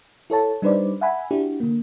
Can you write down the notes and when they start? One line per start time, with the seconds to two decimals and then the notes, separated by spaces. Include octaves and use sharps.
0.30 E4 A4 C#5 A5
0.62 G3 D4 D#4 B4 C5 D5
1.01 E5 F#5 G#5 B5
1.31 D4 E4 F#4 G4
1.60 D3 A#3